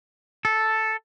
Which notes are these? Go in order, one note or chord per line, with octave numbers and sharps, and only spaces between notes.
A4